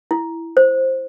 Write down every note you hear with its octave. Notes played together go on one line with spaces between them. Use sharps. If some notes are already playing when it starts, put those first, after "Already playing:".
E4
C5